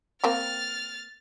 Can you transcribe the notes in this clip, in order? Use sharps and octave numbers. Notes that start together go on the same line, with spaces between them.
A#3 C4 G4 F6 A6